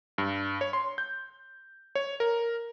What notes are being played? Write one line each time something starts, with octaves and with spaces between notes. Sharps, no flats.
G2
C#5
C6
G6
C#5
A#4